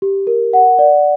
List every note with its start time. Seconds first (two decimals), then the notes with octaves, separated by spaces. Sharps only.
0.02 G4
0.27 A#4
0.53 F#5
0.79 D5